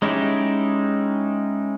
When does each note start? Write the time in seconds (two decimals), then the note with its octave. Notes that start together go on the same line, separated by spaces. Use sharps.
0.02 G#3 C#4 D#4 E4 G4